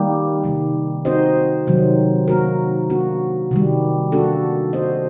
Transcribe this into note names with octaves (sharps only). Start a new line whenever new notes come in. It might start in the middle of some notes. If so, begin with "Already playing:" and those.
Already playing: D#3 G3 A#3 D#4 G4
C3 D#3 G3
C4 D#4 F#4 C5 D#5
C3 D#3 F#3
A#3 F#4 A#4
A#3 D4 F#4
C3 D#3 G3
A#3 D4 F#4 A4
C4 F#4 C5 D#5